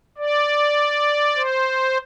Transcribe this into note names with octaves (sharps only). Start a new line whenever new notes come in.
D5
C5